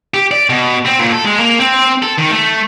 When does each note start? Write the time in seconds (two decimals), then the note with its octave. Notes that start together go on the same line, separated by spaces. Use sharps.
0.14 G4
0.31 D5
0.49 B2
0.86 C4
0.99 A#2
1.12 A4
1.25 G#3
1.39 A#3
1.59 C4
2.02 A4
2.18 D#3
2.30 A3